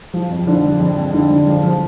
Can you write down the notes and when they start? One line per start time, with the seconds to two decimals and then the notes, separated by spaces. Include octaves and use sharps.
0.14 F3 F4
0.31 F2
0.47 D3 F3 D4
0.63 F3
0.80 F2
0.97 F2
1.13 D3
1.30 D3
1.47 F3
1.63 F3